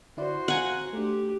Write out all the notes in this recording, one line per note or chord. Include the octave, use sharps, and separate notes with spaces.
D3 E4 F#4 C5 D5
F5 F#5 G#5 A#5
A3 D4 G4